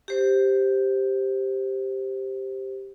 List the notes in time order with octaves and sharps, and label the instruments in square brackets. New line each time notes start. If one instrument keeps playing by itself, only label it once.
[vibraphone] G4 C5